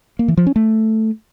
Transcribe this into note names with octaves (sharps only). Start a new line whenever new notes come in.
A#3
E3
F3
C#4
A3